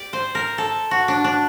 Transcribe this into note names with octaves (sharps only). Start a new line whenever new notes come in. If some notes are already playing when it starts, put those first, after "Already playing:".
Already playing: G4 D5
C5
A#4
A4
F#4
D4
D4